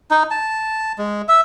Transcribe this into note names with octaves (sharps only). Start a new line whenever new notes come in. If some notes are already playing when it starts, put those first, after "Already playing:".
D#4
A5
G#3
E5